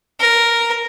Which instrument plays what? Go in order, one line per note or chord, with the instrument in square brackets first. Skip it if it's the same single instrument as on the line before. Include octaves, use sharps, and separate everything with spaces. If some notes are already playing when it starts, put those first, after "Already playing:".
[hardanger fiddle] A#4